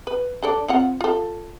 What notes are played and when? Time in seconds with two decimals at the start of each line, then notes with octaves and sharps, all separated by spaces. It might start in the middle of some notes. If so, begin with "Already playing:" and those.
0.07 B4
0.43 D4 A4 D5
0.68 C4 F4 F#5
1.01 F4 A4